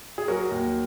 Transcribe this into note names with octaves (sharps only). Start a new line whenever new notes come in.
G#4
F#3 F#4 A#4
D#2